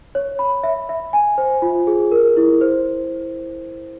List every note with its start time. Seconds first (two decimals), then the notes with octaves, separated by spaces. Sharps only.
0.15 C#5
0.39 B5
0.64 E5
0.89 E5
1.13 G#5
1.38 C5
1.62 F4
1.87 G#4
2.12 A#4
2.37 E4
2.61 C5